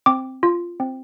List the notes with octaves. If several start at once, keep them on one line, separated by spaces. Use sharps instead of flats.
C4 D6
F4
C4